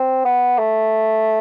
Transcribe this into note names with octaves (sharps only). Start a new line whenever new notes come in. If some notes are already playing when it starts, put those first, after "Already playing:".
Already playing: C4
B3
A3